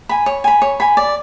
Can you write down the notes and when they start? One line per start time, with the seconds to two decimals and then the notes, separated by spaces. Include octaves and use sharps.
0.09 G#5 B5
0.26 C#5
0.44 G#5 B5
0.62 C#5
0.80 G#5 B5
0.97 D5